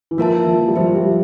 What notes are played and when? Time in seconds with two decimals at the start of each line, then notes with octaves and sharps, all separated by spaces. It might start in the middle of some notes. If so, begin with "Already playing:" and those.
0.11 E3
0.18 F3 A#3 E4 A#4 E5 A5
0.47 F3
0.67 G3
0.76 F3 G4 C5 E5
0.95 G3